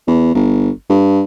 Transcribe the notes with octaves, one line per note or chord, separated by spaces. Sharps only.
E2
G1
G2